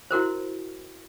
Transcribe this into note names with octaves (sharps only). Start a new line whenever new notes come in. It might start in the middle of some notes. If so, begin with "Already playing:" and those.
E4 F#4 A#4 C5